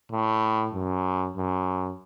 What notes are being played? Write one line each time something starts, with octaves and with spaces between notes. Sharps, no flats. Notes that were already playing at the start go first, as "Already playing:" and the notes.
A2
F#2
F#2